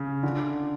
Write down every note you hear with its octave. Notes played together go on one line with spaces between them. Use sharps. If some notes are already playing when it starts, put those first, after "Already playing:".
Already playing: C#3
D3